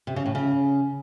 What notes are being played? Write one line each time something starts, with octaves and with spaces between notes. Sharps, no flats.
C3
C#3
A2
C#3